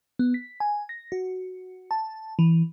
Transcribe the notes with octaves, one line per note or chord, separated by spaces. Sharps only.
B3
B6
G#5
A#6
F#4
A5
E3